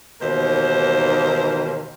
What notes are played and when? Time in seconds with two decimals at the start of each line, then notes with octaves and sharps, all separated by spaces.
0.21 D#2 G#2 B2 E3 A#4 C5